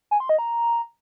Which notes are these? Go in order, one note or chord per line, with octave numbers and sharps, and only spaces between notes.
G#5
C6
D#5
A#5